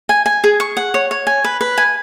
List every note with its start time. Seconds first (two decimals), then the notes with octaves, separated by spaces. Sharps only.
0.09 G#5
0.26 G#5
0.44 G#4
0.60 C#6
0.77 F#5
0.94 C#5
1.11 C#5
1.27 G#5
1.44 B4
1.61 B4
1.78 G#5